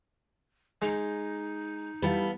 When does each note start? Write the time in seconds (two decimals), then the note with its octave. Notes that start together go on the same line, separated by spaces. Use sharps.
0.82 G#3 D#4
2.02 E3 G3 B3 A4 F5